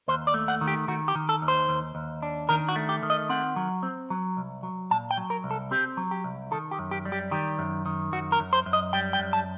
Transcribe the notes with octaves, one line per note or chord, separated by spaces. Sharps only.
D#2 C5
D5
A3
F#5
D#3
G4
D#3 F#4
G4
D#3
A4
D#2
C5
D#2
D#2
D4
D#3 A#4
F#4
A3
G4
D#3
D#5
C4 F#5
F#3
C4
F#3
C2
F#3
A#2 A5
G5
F#3
A#4
C2
A4
C4 G4
F#3
G4
C2
D#3 A4
G4
F#2
G4
G3
G4
D#3 G4
F#2
D#3
F#2 F#4
A#4
F#2
C5
F#2
D#5
G3 G5
G5
F#2
A5